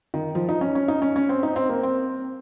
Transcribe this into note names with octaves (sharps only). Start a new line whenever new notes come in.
D#3
F3
D#4
C#4
C#4
D#4
C#4
C#4
C4
D#4
C4
A#3
C4